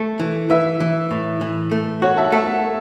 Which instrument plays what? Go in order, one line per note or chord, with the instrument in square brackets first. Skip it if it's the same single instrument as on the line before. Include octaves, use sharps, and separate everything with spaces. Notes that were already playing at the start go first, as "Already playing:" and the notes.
Already playing: [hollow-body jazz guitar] A3
E3
[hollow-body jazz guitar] E3 [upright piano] B4 E5
[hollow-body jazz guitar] E3
A2
E3
A3
[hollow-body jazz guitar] F#4 [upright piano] C#5 F#5
[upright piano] E5 A5
F#5
[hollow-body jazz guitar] A3 [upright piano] E5 A5